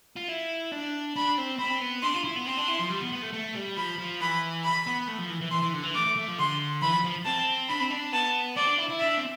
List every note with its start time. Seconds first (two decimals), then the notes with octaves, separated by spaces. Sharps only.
0.17 F4
0.29 E4
0.72 D4
1.16 D4 B5
1.38 C4
1.59 C4 B5
1.81 B3
2.02 D4 C6
2.14 F4
2.24 E4
2.36 B3
2.46 C4 C6
2.58 D4
2.68 E4
2.79 F3
2.89 G3
3.00 B3
3.12 B3
3.22 A3
3.33 A3
3.55 G3
3.77 F3 B5
3.99 F3
4.21 E3 B5
4.64 B5
4.87 B3
5.07 A3
5.18 F3
5.30 E3
5.41 E3
5.51 E3 C6
5.62 E3
5.73 D3
5.84 E3
5.94 A3 D6
6.06 A3
6.16 A3
6.28 F3
6.39 D3 C6
6.82 E3 B5
6.93 F3
7.03 F3
7.25 C4 A5
7.69 D4 B5
7.81 C4
7.91 D4
8.13 B3 A5
8.56 C4 D5
8.67 D4
8.78 E4
8.89 E4
8.99 D4 E5
9.17 C4